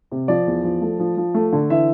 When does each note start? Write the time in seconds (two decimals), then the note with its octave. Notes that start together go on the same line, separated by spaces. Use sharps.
0.12 C3
0.28 F3 D5
0.47 E2
0.64 F3
0.81 A3
0.99 F3
1.17 F3
1.34 A3
1.52 D3
1.70 E3 E5